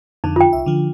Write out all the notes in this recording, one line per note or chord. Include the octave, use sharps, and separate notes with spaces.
F2 D3 D#4
F4 G5
C2 E5
D3 F3